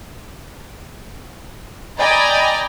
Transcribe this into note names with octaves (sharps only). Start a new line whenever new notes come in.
D5 D#5 G5 G#5 A#5 B5